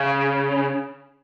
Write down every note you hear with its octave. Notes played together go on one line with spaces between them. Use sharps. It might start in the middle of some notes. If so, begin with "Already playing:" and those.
Already playing: C#3